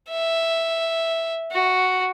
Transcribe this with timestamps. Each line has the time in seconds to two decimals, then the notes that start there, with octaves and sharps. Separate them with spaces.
0.10 E5
1.52 F#4